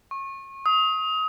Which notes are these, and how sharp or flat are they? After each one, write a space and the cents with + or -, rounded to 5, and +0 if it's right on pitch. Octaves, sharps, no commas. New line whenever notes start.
C#6 -30
D#6 +30